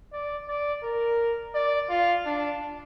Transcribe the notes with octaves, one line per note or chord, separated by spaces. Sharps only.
D5
D5
A#4
D5
F4
D4